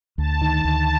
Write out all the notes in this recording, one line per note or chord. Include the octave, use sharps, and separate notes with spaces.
D2 A5
D#3
A5
D2